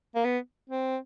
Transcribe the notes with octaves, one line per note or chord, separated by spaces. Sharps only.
A#3
B3
C4